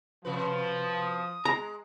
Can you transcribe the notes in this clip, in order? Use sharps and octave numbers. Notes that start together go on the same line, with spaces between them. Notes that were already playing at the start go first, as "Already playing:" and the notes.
C3 F3 F#4 B4
D#6
G#3 A#5